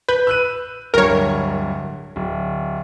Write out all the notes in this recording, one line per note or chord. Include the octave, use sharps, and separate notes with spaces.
B4 G6
E6 F#6 D#7
D1 G2 A#4 C#5
D1